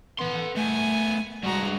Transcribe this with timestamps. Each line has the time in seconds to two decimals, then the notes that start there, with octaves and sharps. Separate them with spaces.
0.19 B3 A4 C6
0.56 A3 B3 G#5
1.44 G2 G#3 F#4 A#5